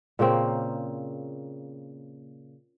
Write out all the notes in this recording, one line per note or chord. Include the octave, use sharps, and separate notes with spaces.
A#2 C#3 A#3 C4